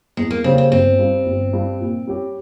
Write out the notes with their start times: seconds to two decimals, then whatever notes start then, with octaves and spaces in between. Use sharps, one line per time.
0.17 E2 G#3
0.31 A#3
0.44 C#3 G3 A#3 C4 C#4
0.58 C4
0.72 G1 C4
0.99 G2 G3
1.26 G1
1.53 G2 G3
1.80 A#2
2.07 G3 C#4 G4